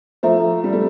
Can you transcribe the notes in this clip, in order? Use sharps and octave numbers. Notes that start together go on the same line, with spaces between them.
F3 A3 C5 E5 A#5
G3
A3